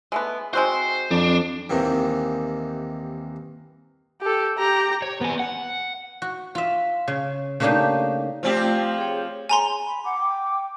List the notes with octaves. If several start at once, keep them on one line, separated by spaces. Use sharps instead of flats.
G#3 A3 B3
G#3 C4 F#4 C5
F2 D4
D#2 C3 D#3 E3
G4 A4
G4 A#5
C#5
B3 G#5
F#5
F#4
F4 E5
C#3
C#3 A3 A#3 D4 D#4 G4
F3 A3 C4 F4 G4 D5
G#4 C#5
G#5 A#5 C6
B5
F#5 D6
G5